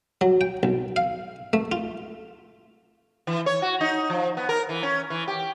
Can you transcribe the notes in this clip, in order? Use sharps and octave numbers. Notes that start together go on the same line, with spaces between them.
F#3
G5
B1
F5
A3
F4
E3
C#5
F#4
D#4
F3
B3
A#4
E3
C#4
E3
G4